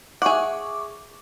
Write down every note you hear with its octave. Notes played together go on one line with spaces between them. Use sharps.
G#4 E5 F#5 C#6 D6